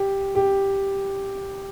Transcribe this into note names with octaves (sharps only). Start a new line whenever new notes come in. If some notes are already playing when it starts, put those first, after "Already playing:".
Already playing: G4
G4